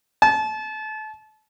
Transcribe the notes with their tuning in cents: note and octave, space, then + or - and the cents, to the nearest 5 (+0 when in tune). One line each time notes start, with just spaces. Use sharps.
A5 -30